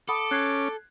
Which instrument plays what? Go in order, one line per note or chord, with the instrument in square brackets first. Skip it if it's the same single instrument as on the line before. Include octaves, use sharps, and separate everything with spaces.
[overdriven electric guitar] A4 [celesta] F#5 B5 D#6 [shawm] D6
[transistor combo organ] C#4 [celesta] F#6 G#6 C7